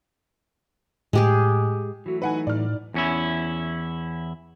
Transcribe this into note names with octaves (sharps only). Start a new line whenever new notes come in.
A2 G#3 G4 G#4
E3 F#3 A3 F#4
D#4 B4 F#5 G#5
A2 D5 F6
E2 C#4 E4